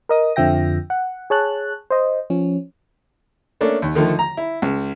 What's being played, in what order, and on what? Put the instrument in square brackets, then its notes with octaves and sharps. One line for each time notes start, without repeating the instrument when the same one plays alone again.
[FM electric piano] A#4 D#5 D#6
F2 D3 F3 E5 G5 A#6
F#5
G#4 C#5 A5 F#6
C5 D#5
F3 C#4
[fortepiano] A3 A#3 C#4 D4
D#2
D3 D#3 F3 A3
A#5
E4
C#2